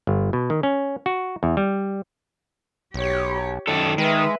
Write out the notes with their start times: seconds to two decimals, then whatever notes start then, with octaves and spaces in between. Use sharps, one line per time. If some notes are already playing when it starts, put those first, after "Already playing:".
0.07 G1
0.33 B2
0.50 D#3
0.63 C#4
1.06 F#4
1.43 E2
1.57 G3
2.94 B1 G4 C#5
3.67 F#2 D#3 A4 D5
3.98 D#3 G#3 B4 E5